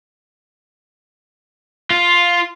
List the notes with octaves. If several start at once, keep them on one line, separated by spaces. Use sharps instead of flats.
F4